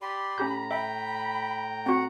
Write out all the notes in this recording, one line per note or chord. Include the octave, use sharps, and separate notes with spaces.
G4 D5 B5 C6
A2 C#4 G4 A#5 G6
E5 G5 B5
C4 F#4 F#5